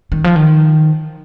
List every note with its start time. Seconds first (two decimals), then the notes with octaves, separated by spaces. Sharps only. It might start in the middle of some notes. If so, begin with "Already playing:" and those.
0.12 D#3
0.24 F3
0.36 D#3